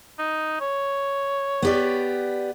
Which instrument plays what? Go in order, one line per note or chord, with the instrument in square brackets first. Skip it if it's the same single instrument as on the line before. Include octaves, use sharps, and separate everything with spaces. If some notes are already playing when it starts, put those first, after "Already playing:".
[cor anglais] D#4
C#5
[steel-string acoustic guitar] B3 G4 D5